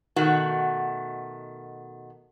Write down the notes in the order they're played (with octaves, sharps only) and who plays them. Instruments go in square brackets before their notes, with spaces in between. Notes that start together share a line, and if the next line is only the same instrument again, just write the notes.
[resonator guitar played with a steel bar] B2 D#3 A3 F#4